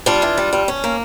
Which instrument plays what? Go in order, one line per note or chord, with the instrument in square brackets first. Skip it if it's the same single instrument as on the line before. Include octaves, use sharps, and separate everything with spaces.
[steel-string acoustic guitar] G3 D4 F4
E3
G3
G3
C#4
A#3